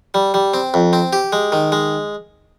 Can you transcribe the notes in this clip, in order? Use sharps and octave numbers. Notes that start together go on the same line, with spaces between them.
G3
G3
C4
F2
C4
G4
G#3
D#3
G#3